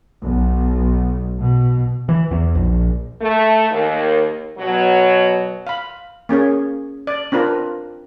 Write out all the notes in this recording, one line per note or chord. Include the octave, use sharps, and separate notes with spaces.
B1
B2
E3
E2
A#1
A3
D#2
B2 F#3
F5 B5
A#3 C#4 G#4 C#5
D5
C4 D4 F4 A#4 B4